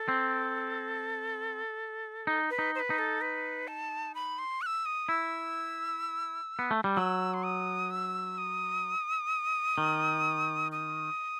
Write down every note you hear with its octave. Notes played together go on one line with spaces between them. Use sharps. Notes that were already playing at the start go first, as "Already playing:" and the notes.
Already playing: A4
C4
D#4
B4
D#4
C5
B4
D#4
A4
B4
A5
B5
C6
F#6
E6
D#6
E4 E6
B3
A3
G3
F#3 E6
C6
D#6
E6
D#6
D#3
D#6